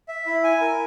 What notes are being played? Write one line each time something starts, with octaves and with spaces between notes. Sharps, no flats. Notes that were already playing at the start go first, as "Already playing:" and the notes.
E5
E4
G#5
A#4